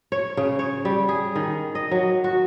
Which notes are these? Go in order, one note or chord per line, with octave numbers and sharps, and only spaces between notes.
C#5
C#3
C#5
G3
G#4
D#3
D#5
F#3
F#4